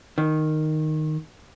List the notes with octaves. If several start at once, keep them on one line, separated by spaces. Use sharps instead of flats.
D#3